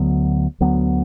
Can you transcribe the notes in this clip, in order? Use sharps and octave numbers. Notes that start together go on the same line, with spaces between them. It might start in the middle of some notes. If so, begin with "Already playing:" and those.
Already playing: D2 D3 F#3 B3
D2 D3 F#3 B3